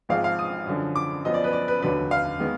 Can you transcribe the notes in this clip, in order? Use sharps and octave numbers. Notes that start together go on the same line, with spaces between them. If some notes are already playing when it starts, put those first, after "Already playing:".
G#1 G#2 F3 G#3 F5
F5
D#6
F#2 D3 F3
D6
F#2 F3 B3 D#5
D5
B4
D5
B4
F1 D#2 D3 F#3 B4
F5
D#3 G#3 B3